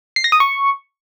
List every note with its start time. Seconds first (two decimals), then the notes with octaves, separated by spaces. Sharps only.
0.16 C7
0.24 A#6
0.32 D#6
0.40 C#6